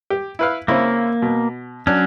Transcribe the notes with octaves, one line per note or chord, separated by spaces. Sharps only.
G4
E4 B4 F5
C#3 A#3 C4 E4
B2
F#3 C#4 D4